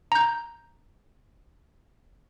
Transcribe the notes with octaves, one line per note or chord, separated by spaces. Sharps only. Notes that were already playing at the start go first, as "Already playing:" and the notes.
A#5 G6